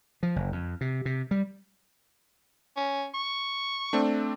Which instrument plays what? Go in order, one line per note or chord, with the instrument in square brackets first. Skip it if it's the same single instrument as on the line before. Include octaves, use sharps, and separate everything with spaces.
[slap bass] F3
F#1
F2
C3
C3
G3
[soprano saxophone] C#4
C#6
[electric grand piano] A3 C4 D4